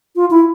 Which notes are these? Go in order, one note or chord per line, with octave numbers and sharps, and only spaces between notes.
F4
E4